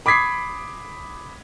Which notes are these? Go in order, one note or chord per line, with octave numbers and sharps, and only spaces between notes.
B5 D6 D#6 G#6 B6 C7